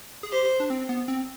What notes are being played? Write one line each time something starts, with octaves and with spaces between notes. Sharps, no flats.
G#4
G4 C5
D4
C4
B3
C4